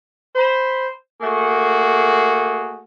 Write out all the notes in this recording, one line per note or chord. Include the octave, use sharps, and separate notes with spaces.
C5 B5
A3 A#3 F#4 G#4